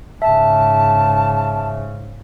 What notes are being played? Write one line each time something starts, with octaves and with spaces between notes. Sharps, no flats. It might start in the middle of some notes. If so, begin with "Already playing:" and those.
G#2 C#3 E5 A5